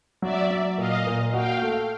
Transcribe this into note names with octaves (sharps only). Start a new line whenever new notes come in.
F#3 D5 E5
F#3
A#2 D#5 F5
A#2
F#4 F5 G5
A3